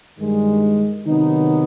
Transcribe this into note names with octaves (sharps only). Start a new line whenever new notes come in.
G2 D#3 G#3
C3 D#3 F#3 B3 D#4